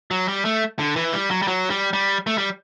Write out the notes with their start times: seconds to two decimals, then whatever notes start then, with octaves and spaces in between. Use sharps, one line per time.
0.11 F#3
0.28 G3
0.45 A3
0.79 D3
0.96 E3
1.13 G3
1.31 F#3
1.42 G3
1.48 F#3
1.70 G3
1.93 G3
2.27 A3
2.38 G3